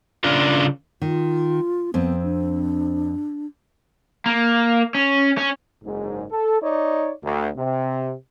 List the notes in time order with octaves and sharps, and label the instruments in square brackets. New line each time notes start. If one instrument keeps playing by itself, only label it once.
[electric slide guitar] C#3 D4 F4 A#4
[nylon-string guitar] D#3 [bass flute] F4
[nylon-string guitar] F2 C4 [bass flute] B3
[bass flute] D4
[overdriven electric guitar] A#3
C#4
C#4
[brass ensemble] F#1 G#2
A4
D#4 C#5 D5
D2
C3